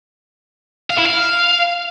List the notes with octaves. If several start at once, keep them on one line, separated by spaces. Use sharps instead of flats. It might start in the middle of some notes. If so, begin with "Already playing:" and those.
F5
E4
F5